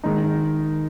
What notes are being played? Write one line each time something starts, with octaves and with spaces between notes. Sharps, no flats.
D#3 G#3 D#4